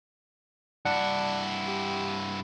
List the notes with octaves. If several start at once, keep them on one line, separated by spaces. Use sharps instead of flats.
G2 D4 E4 F#5
G4